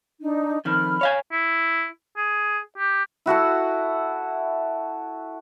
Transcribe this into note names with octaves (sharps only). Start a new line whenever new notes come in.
D4 D#4
F2 D#3 B5 F6
C#5 F5 G#5
E4
G#4
G4
E4 F#4 A4 F#5